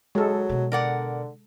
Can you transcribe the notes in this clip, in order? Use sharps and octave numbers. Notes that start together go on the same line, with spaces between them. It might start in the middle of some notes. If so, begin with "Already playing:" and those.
F#3 G#3 A4
B2 D#3
D3 A#4 D5 F#5